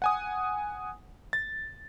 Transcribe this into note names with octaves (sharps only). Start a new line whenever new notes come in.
F#5 G#5 D#6
A6